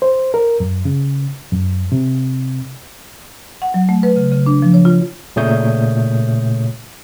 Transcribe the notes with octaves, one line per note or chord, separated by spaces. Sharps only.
C5
A#4
F#2
C#3
F#2
C3
F#5
F#3
A3
B4
C#3
C#3
D4
F3
C#5
F4
A#2 C#3 A3 C#5 D#6 G6